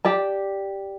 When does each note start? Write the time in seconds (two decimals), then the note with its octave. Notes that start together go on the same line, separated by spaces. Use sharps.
0.05 G4 D5 A5